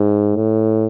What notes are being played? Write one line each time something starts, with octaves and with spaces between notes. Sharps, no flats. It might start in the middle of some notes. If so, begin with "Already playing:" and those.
Already playing: G#2
A2